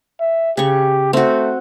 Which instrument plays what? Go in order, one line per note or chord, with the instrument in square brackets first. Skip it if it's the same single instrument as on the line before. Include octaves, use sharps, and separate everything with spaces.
[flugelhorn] E5
[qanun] C#3 C#6 [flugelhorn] G4
[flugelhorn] A3 [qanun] C4 F#4